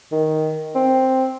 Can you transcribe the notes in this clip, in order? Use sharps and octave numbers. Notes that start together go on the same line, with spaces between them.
D#3
C4